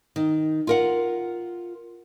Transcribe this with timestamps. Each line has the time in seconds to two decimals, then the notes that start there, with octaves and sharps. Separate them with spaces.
0.16 D#3
0.67 F4 A#4 F#5